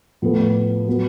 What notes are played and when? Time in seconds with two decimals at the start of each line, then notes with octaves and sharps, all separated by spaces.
0.22 A2 F3 B3 F4 A4
0.88 F#3 B3